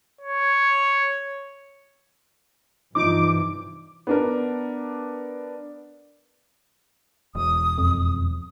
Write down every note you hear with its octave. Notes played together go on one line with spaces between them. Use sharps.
C#5
G2 C3 E3 F3 D#4 D6
B3 D4 A#4
E1 D#6
F2